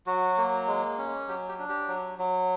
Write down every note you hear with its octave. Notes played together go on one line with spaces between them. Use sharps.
F#3 F#4
A#3
G#3
C#4
F#3 G4
G4
D4
G4
F#3
F#3